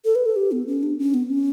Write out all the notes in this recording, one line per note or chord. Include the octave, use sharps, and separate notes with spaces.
A4
B4
A4
G4
B3
C#4
D4
C#4
B3
C#4